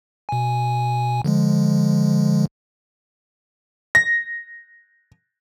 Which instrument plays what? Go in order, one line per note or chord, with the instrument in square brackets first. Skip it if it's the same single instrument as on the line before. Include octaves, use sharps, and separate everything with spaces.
[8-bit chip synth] B2 G#5
D3 F3 G#3
[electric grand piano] A#6